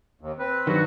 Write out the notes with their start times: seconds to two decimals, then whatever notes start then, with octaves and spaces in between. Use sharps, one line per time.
0.21 D#2
0.39 C4 B4
0.67 G2 D#3 F#3 F#4